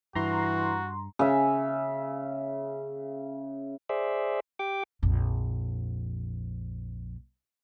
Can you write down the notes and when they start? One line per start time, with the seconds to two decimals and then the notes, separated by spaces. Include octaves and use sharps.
0.15 G2 E3 F#4 A#5 C6
1.19 C#3 E5
3.89 G#4 C5 D5 E5
4.59 G4 G5 D6
5.02 A#1 F2